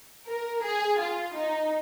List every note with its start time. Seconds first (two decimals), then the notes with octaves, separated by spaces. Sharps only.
0.27 A#4
0.62 G#4
0.99 F4
1.34 D#4